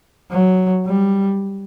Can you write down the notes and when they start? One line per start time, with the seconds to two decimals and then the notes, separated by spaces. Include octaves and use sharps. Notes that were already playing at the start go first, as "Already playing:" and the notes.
0.31 F#3
0.86 G3